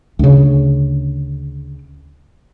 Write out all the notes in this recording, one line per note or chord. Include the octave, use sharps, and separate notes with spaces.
D2 C#3